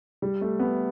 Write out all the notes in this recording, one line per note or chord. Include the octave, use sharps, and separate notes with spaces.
G3
A3
B3